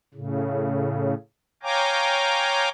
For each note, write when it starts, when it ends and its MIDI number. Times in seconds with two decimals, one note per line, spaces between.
0.14 1.14 45
0.14 1.14 49
1.63 2.69 73
1.63 2.69 77
1.63 2.69 79
1.63 2.69 80
1.63 2.69 82
1.63 2.69 86